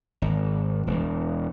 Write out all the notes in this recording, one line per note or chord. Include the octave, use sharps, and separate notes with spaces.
G#1
E1